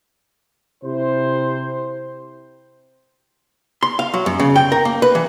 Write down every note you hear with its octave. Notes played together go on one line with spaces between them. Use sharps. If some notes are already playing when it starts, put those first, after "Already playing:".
C3 E4 C5
C6
F5
F#3
F#2
C#3
G5
A#4
A#3
B4
E3